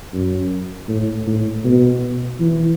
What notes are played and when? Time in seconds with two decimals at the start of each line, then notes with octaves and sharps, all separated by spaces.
0.13 F#2
0.88 A2
1.27 A2
1.64 B2
2.40 E3